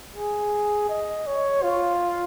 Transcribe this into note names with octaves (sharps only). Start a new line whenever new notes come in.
G#4
D#5
C#5
F4